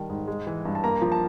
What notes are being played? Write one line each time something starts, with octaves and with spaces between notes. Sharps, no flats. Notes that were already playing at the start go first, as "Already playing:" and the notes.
Already playing: D#3 G3 A5
G#2
G#3
E3
G2
A5
A#3 A#5
F3
A5